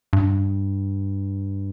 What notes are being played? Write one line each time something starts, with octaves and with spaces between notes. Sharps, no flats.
G2